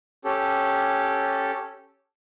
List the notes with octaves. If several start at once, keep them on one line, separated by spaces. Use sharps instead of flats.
C#4 G4 A4